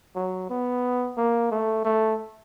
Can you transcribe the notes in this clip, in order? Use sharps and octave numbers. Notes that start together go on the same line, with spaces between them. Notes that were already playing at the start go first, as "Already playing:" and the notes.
F#3
B3
A#3
A3
A3